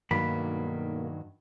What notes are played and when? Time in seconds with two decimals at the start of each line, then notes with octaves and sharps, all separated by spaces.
0.11 B1 G2 D#3 F#3 A#3 B5